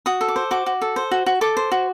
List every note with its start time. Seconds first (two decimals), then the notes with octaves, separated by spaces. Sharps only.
0.06 F#4 D#6
0.21 A4
0.28 D6
0.36 C5
0.51 F#4 D6
0.66 F#4
0.81 A4
0.96 C5
1.11 F#4
1.26 F#4
1.41 A4 D6
1.57 C5
1.72 F#4